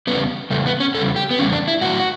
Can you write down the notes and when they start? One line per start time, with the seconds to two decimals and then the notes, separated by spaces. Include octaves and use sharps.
0.07 E2 C#3 G3 B3
0.50 E2 C#3 G3 A3
0.66 B3
0.80 C#4
0.94 E2 C#3 G3 A4
1.16 G4
1.31 B3
1.39 E2 C#3 G3 C#4
1.52 D4
1.68 E4
1.81 A2 F#3 F#4